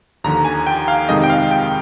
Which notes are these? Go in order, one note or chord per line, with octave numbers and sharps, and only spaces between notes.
D#2 D3 F3 A#5
G#5
G5
F5
F2 C3 D#3 G#3 D#5
G5
F5
G5